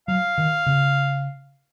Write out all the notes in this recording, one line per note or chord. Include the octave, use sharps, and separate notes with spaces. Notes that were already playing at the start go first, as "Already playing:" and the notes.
F#3 F5
D#3
C#3